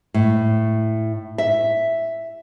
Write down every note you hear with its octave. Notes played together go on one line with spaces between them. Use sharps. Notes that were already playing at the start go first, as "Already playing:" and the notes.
A2
E5